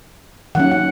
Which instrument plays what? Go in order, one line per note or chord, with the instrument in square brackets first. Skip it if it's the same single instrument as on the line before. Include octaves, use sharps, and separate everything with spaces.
[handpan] D#3 F#3 C#4 F#5
F#5